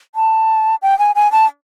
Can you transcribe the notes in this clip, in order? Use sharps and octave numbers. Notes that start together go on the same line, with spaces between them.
A5
G5
G#5
G#5
A5